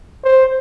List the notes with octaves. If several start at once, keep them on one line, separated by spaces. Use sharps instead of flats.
C5